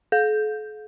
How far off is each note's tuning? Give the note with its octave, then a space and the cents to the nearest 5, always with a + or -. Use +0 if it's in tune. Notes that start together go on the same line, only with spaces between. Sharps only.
A4 -45